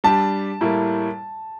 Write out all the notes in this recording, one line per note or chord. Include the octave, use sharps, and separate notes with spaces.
G3 D4 G4 A5
A2 G3 A#3 E4